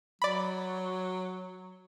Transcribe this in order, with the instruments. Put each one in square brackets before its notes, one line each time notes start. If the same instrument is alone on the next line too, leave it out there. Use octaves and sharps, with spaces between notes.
[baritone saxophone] F#3 [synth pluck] D5 B5